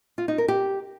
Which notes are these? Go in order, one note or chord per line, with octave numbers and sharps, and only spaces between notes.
F4
D#4
A#4
G4